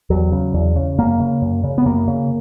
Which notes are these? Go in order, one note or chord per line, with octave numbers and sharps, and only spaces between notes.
E2 F#3
C#3
E2
C#3
F#2 A#3
C#3
F#2
C#3
B3
F#2 A#3
C#3